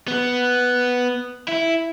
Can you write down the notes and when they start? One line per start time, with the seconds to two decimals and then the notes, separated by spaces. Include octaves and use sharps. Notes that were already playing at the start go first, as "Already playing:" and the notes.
0.08 B3
1.48 E4